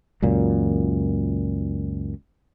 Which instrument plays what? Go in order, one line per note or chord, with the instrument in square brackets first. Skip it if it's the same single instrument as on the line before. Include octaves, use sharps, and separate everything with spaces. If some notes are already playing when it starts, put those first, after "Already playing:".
[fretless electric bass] C#2 F#2 A#2